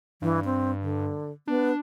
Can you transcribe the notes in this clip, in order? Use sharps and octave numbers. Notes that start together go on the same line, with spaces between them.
G2 E3
C4
D3
B3 D4